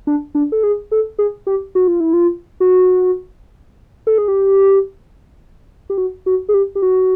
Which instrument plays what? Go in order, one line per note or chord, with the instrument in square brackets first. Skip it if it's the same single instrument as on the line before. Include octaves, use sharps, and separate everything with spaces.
[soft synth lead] D4
D4
A4
G#4
A4
G#4
G4
F#4
F4
E4
F4
F#4
A4
G#4
G4
G4
F#4
F#4
G#4
G4
G4
F#4